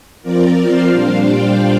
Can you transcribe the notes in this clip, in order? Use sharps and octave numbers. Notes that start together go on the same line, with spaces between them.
F3 C4 F4 A#4 D5
C5 F5
A#2 G3 D4
D5 G5